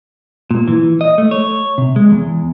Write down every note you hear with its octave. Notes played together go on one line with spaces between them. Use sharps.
A#2
E3
D#5
A3
C#5
C3
G#3
E2